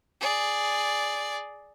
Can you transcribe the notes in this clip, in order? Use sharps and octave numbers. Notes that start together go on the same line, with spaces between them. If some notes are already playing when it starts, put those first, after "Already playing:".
G#4 D5